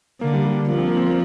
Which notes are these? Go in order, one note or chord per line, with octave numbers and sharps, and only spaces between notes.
D3 A#3
G3
G3
D4
F3 A#3
C4
A#3
C4
A#3